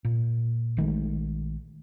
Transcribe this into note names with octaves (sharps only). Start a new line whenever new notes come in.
A#2
A#1 D#3 G#3 A3